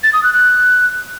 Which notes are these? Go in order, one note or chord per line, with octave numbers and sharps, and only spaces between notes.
A6
D#6
F#6
F#6